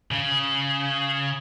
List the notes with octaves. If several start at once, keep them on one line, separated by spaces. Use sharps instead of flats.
C#3